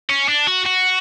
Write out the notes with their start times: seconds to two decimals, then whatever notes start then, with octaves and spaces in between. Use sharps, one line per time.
0.10 C#4
0.28 D4
0.47 F#4
0.65 F#4